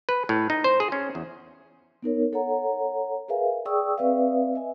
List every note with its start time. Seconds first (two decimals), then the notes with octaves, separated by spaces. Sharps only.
0.09 B4
0.29 A2
0.50 D#4
0.64 C5
0.80 G#4
0.92 C#4
1.15 E2
2.02 B3 D#4 A#4 C#5
2.33 A4 C#5 F#5 A#5
3.28 G#4 A#4 B4 E5 F5 G#5
3.66 G#4 D5 G5 C#6 D#6 E6
3.98 C4 B4 D5 E5 F5
4.54 D#5 E5 G#5